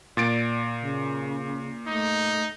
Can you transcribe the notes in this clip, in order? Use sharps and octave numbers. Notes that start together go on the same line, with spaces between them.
A#2 D5 A6 D7
C#3
A3 D#4